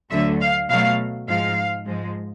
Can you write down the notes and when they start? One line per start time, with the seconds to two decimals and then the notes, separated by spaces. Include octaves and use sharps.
0.11 D2 D3 F#3 A3 E5
0.41 F5
0.69 B2 F#3 A3 F5
1.28 G#2 F3 G#3 F5
1.86 G#2 F3 G#3